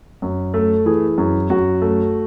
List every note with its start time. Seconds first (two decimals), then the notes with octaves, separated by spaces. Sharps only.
0.22 F#2
0.54 A3 A4
0.86 E3 G#4
1.18 F#2
1.50 F#2 F#4
1.82 A3